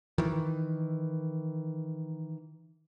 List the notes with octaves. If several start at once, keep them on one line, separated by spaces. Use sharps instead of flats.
D#3 E3